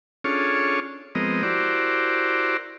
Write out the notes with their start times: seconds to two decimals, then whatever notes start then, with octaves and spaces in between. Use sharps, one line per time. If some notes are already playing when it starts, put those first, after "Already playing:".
0.24 C#4 D4 F4 G#4 A4 C#5
1.15 F3 G#3 B3 C4 A#4 D#5
1.43 E4 F#4 G4 A#4 C5 D5